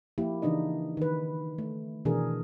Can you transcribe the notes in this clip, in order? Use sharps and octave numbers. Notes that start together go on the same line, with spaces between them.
F3 A#3 E4 G4
C#3 E3 D4 D#4 D#5
D#3 B4
A3
B2 D#3 E3 D4 G#4 A#4